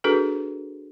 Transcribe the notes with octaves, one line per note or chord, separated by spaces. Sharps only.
D4 F#4 G#4 A4 B4